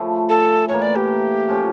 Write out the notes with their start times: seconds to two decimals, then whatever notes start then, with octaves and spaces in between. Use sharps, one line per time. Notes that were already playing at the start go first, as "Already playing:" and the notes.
Already playing: C#3 F3 A3 C#4 E4
0.29 A4
0.69 A2 E3 A#3 C#5
0.82 D5
0.96 G4
1.49 A2 F3 C#4